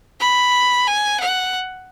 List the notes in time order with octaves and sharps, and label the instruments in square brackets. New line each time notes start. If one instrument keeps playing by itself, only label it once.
[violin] B5
G#5
F#5